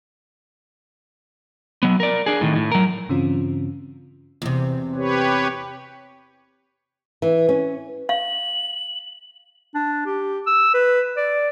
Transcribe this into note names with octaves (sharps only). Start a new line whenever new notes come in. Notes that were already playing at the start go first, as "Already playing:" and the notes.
F#3 B3
A#4 D5
D4 G#4
A2 D#3
A2
F#3 A#4
G2 C#3 E3 C4 C#4 F4
E2 C3
G4 B4 C#5
E3
C#4
F5 F#7
D4
G4
E6
B4
D5